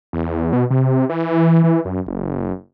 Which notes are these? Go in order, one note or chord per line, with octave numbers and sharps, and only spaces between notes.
E2
B2
C3
E3
E3
F#2
F#1